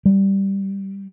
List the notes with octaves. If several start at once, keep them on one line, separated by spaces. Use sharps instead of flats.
G3